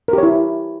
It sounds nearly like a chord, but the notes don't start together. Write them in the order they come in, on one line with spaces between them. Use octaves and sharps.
A#4 G4 C#5 E4